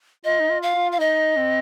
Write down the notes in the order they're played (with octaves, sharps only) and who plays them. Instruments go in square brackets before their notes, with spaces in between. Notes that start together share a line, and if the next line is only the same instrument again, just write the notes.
[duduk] F4 [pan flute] D#5
[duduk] D#4
F4
[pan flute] F5
[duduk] F4
[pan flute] F5
[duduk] D#4 [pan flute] D#5
[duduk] C4